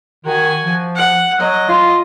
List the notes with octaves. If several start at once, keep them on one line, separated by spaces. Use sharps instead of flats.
D#3 F#4 G#5
F3
F#5
F#3 D#5
F4